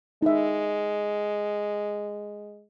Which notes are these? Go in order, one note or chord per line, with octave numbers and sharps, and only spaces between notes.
G#3 D#4 E5